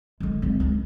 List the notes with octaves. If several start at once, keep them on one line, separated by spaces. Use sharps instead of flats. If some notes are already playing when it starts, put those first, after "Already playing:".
D3 G#3
G#3 C4
C#2